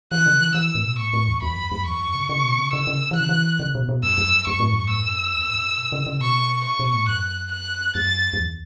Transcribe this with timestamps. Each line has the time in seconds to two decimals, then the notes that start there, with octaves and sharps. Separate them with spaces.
0.12 E3 F#6
0.26 C#3
0.40 E3
0.54 E3 E6
0.75 A2
0.84 B2
0.98 A2 C#6
1.13 A2
1.28 E2
1.42 E2 B5
1.56 F#2
1.71 F#2
1.86 E2 C#6
2.00 F#2
2.15 C#3
2.29 C#3
2.44 B2
2.58 C#3
2.73 C#3 E6
2.87 C#3
3.11 E3
3.16 C#3 F#6
3.29 E3
3.60 C#3
3.75 B2
3.89 B2
4.03 F#2 E6
4.18 F#2
4.47 F#2 C#6
4.60 A2
4.73 F#2
4.87 A2 E6
5.00 F#2
5.34 E2
5.50 A2
5.56 F#2
5.77 B2
5.92 C#3
6.06 C#3
6.21 B2 C#6
6.65 C#6
6.79 B2
6.94 A2
7.08 F#2 F#6
7.52 F#6
7.95 F#2 A6
8.33 F#2
8.39 E2